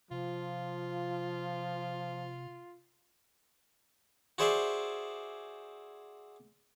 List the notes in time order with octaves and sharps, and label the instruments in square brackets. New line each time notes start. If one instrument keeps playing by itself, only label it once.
[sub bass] C3 [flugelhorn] F3 [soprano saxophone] F4
[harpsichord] F#4 G#4 C5 D5 E5